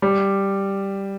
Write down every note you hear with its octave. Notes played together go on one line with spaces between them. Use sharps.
G3